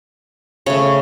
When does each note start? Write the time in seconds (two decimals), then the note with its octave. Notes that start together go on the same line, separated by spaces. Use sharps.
0.66 C#3 A3 C#5